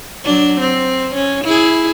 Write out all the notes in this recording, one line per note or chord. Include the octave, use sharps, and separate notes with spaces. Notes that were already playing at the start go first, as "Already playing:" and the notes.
F#3 D4
C4
C#4
E4 G#4